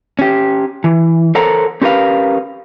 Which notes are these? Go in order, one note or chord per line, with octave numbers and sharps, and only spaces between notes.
C#4 G4
E3
A4 A#4 C5 C#5 F#5 A#5
C#4 G4 A#4 B4 F5